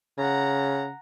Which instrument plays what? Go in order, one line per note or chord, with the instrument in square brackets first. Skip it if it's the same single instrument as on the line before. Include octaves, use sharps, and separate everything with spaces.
[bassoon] C#3 [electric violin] F#5 A#5